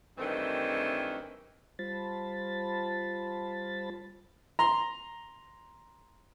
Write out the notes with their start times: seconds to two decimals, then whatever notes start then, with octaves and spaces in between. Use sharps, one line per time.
0.18 G2 D#3 E3 A3 C4
1.79 G3 F4 C5 A5 B5 A6
4.59 A#5 C6